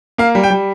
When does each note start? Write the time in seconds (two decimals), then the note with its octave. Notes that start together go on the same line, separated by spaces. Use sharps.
0.18 A#3 F5
0.35 G3
0.43 G5
0.50 G3